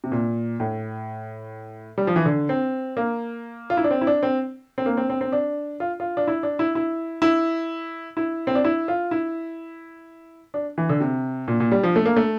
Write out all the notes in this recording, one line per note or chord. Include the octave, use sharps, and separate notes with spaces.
C3
A#2
A2
G3
F3
E3
D3
C4
A#3
F4
E4
D4
C4
E4
D4
C4
C4
A#3
C4
C4
C4
D4
F4
F4
D4
E4
D4
E4
E4
E4
E4
C4
D4
E4
F4
E4
D4
E3
D3
C3
A#2
A#2
G3
F3
A3
A#3
A3